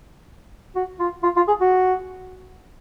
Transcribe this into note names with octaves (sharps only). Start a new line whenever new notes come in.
F#4
F4
F4
F4
G#4
F#4